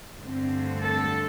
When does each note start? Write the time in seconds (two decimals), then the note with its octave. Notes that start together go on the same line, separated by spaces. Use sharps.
0.20 G2 D3 A3 C4
0.81 A4